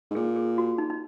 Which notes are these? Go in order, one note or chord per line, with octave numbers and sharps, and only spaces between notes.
G#2
A#2 G#4
G#4
F#4
D#4
D#4